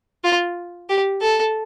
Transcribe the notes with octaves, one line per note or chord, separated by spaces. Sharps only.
F4
G4
A4